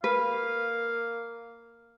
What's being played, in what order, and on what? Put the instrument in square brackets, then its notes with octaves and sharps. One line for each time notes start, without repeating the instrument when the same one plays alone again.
[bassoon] A#3 [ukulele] B4 [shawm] F5